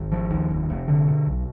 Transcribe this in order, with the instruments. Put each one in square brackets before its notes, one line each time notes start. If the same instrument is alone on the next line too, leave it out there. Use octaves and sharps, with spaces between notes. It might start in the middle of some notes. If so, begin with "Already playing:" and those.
Already playing: [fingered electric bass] G#1
F3
D#2
F1
F1
D3
B2
B1